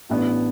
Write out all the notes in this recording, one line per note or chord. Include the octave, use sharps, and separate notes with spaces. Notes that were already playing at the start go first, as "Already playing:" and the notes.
A1 A2 E3 B3 D4